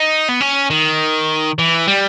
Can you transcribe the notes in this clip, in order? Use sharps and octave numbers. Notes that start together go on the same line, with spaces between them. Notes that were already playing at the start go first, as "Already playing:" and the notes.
Already playing: D#4
B3
C#4
D#3
E3
G3